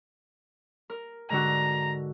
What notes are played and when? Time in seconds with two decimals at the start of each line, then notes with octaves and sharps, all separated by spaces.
0.90 A#4
1.30 G#2 D3 F#4 A#5